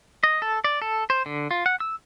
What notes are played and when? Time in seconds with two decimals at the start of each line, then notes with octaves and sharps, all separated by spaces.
0.23 D#5
0.42 A4
0.64 D5
0.82 A4
1.10 C5
1.26 D3
1.51 F4
1.66 F#5
1.80 E6